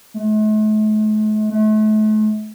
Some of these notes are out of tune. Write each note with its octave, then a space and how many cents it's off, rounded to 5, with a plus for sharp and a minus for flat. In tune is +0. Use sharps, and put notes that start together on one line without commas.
A3 -45
A3 -40